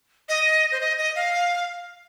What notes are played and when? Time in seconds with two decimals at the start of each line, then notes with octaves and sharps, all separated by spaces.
0.29 D#5
0.72 C5
0.81 D#5
0.98 D#5
1.16 F5